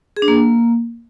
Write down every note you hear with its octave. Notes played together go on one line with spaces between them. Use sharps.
G#4
D4
A#3